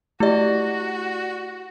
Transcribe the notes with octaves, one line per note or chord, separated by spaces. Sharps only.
A3 E4 F#4 G4 D5 D#5